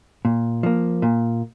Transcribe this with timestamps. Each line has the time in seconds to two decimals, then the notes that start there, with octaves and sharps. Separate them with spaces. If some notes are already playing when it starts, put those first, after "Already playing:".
0.25 A#2
0.63 F3 A#3
1.02 A#2